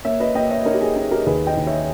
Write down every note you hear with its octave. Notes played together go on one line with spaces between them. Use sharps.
A#3 C#5 E5
B4 D#5
A#3 D#5 G5
C#5 E5
D#4 A#4 C#5
G4
G#4
D#4 G#4
G4 A#4
D#2 G#4 B4
D#5 G5
D#2
C#5 E5